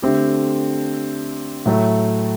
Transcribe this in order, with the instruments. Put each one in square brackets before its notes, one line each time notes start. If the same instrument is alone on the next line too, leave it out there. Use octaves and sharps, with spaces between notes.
[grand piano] D3 A3 C4 G4
A2 F#3 A3